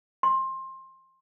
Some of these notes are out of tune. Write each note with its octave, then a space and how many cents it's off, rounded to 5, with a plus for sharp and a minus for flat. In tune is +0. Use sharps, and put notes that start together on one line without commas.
C6 +20